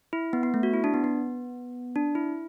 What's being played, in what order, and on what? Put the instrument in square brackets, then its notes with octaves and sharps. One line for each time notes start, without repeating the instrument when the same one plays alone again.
[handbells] E4
B3
B3
A3
F#4
E4
D4
B3
B3
D4
E4